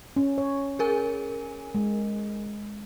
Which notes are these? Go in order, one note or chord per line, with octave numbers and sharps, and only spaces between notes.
C#4
C#5
G#4 A#4 G#5
G#3